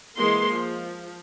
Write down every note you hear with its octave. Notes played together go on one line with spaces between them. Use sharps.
E3 G#3 A#3 C6
F3